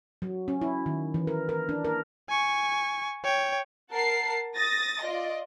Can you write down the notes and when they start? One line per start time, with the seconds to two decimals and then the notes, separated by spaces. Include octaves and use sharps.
0.22 F#3
0.48 C#4
0.62 E4
0.86 D#3
1.14 E3
1.27 A#4
1.49 A#4
1.69 D4
1.85 A#4
2.29 G#5 C#6
3.24 C#5 G5
3.91 A#4 F#5 A5 C7
4.55 D#6 A6 A#6
5.02 F4 D5 D#5